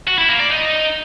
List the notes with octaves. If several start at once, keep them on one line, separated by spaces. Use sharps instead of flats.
F#4
E4
A#3
D5
D#4